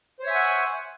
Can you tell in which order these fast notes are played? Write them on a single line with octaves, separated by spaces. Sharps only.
C5 C#5 E5 G#5 F#5